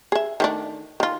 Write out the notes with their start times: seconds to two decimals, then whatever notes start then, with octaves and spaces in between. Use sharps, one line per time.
0.12 G#4 E5
0.40 D#3 A3 D4
1.00 D#3 F4